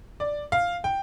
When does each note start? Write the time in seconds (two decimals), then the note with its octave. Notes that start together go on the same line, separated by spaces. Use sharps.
0.20 D5
0.52 F5
0.84 G5